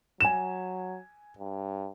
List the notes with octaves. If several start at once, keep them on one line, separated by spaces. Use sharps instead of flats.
F#3 G#5 E7
G2